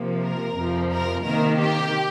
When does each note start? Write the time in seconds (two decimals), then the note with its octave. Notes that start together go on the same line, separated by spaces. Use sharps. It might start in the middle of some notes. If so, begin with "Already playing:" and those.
Already playing: C3 F3 A#3
0.23 A#4
0.56 F2 C3 F3
0.90 A#4
1.23 C3 D#3 A#3 A#4
1.57 G4